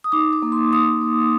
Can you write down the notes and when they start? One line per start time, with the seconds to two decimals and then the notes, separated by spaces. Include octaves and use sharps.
0.04 D#6
0.12 D#4 D6
0.33 D6
0.42 A#3
0.52 C6
0.72 D#4 D#6
1.01 A#3